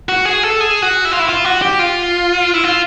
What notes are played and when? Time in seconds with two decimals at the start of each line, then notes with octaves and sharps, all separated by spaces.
0.09 F#4
0.25 G#4
0.43 A4
0.61 G#4
0.82 F#4
1.05 E4
1.12 F4
1.19 E4
1.28 F4
1.44 F#4
1.62 G4
1.79 F4
2.54 E4
2.64 F4